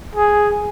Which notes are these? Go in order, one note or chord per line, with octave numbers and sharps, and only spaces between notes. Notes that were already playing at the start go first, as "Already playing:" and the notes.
G#4